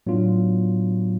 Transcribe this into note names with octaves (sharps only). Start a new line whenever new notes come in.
A2 F#3 B3 D4 F4